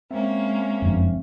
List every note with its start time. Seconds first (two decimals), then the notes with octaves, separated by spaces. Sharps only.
0.11 G#3 A#3 C4 C#4 E5
0.82 F#1 F2 D4